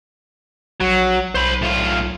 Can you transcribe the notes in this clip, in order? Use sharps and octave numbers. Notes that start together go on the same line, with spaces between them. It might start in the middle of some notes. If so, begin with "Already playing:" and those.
A#1 F#3
B1 C5 B5
A2 F4